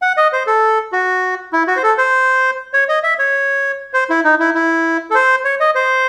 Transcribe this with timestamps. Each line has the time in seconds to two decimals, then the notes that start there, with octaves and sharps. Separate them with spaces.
0.02 F#5
0.17 D#5
0.33 C5
0.47 A4
0.92 F#4
1.53 E4
1.67 F#4
1.76 C5
1.83 A4
1.98 C5
2.74 C#5
2.89 D#5
3.03 E5
3.19 C#5
3.94 C5
4.10 E4
4.24 D#4
4.40 E4
4.55 E4
5.10 A4
5.15 C5
5.44 C#5
5.60 D#5
5.75 C5